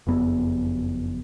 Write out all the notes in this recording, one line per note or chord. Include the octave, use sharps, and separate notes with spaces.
F#1 F2 B3